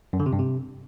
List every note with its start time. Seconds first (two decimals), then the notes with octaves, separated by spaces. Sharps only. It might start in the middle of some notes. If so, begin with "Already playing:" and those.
0.13 F#2
0.20 D3
0.26 C3
0.33 G2
0.39 C3